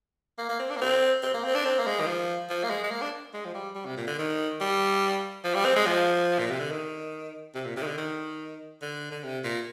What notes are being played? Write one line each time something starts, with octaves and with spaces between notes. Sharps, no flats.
A#3
A#3
C4
D4
A#3
C4
C4
A#3
C4
D4
C4
A#3
G#3
D#3
F3
F3
A#3
G#3
G#3
A#3
D4
G#3
F3
G3
G3
C3
A#2
D3
D#3
G3
F3
G3
C4
G#3
F3
A#2
C3
D3
D#3
C3
A#2
C3
D#3
D3
D#3
D3
D3
C3
A#2